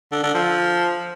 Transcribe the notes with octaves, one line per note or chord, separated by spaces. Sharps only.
D3
D3
F3